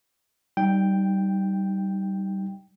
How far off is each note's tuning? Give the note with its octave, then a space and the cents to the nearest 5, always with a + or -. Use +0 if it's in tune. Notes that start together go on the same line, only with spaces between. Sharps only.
G3 -20 D#4 +0 G5 +0